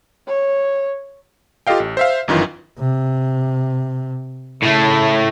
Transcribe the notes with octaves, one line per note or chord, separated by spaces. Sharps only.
C#5
F4 G4 A4 D#5 F5 G5
A1
C5 E5 F5
G1 F#2 D#3 E3 F4
C3
A2 C#3 A3